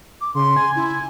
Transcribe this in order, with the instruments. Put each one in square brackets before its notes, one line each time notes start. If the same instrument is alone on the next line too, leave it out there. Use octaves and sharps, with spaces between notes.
[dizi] D6
[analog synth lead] C#3 [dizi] C6
[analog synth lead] G#5
[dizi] E4